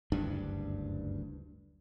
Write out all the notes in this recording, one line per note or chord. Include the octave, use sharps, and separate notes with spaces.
F#1 D2 G2 D4